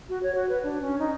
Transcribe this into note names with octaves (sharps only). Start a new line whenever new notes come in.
F#4
C#5
F#4
B4
D4
C#4
D#4